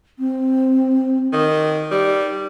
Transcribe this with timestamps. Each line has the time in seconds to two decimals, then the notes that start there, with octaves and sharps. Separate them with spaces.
0.19 C4
1.33 D#3
1.72 D#4
1.92 G3